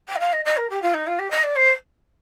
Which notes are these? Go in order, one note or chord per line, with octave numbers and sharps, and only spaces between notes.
G5
D#5
F5
D#5
D#5
A#4
G4
F4
D#4
F4
G4
D#5
D5
C5